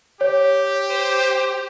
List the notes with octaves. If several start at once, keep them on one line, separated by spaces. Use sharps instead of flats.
G4 C#5
C5